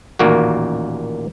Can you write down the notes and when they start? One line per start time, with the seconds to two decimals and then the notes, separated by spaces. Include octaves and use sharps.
0.19 A1 D#2 A#2 A#3 F#4